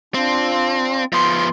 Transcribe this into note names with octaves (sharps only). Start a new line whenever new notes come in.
C4 D4 F4
F3 B3 C6